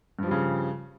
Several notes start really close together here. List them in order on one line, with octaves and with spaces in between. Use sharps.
G2 F3 G3 C#3